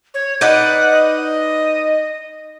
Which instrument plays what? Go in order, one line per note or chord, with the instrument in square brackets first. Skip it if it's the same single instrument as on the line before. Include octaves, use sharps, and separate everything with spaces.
[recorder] C#5
[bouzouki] D#4 B4 D5 [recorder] F#5
[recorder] D#5